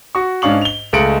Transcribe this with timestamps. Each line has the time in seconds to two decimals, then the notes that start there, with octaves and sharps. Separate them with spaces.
0.15 F#4 C#6
0.42 G#2 C#4 D4 F5 C#6 F#7
0.61 F7 G7
0.93 C#2 G#3 A3 C#7 D7 F#7